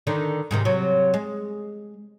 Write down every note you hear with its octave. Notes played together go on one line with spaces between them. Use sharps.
D3 D#3 D4
G#2 C3 D#3
C3 F#3
G#3